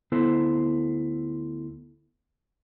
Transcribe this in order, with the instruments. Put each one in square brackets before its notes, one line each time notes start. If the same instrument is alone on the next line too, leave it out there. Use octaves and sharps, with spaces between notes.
[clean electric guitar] D2 B3 E4 A4 C5